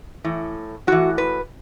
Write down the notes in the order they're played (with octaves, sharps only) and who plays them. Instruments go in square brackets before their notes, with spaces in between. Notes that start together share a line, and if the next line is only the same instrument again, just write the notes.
[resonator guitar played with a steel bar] A2 E3
A2 E3 F#4
B4